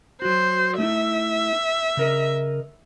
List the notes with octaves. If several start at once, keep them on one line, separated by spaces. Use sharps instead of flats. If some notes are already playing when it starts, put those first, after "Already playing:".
F#3 F#4 C5
A3 D#4 E4 E5
C#3 A#4 D#5